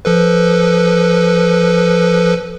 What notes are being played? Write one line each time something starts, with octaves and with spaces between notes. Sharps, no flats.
F3 A4 B4